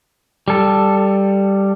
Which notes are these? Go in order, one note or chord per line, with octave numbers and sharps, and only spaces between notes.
G3 A4